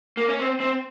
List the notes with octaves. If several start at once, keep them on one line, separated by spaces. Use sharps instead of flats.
A#3
C#4
C4
C4